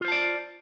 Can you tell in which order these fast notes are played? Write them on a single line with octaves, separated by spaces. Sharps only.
F4 C5 A5 D5